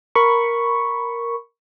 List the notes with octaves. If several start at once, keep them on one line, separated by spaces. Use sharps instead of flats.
A#4 B5 C#6